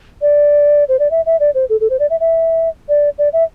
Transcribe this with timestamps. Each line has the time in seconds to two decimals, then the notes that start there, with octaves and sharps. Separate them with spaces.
0.22 D5
0.89 C5
0.99 D5
1.11 E5
1.26 E5
1.40 D5
1.55 C5
1.70 A4
1.81 A4
1.90 C5
2.00 D5
2.10 E5
2.20 E5
2.89 D5
3.18 D5
3.33 E5